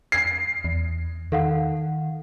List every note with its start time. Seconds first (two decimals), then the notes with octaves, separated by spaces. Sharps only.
0.12 G#6 C7
0.64 E2
1.32 D#3 A4 F5 F#5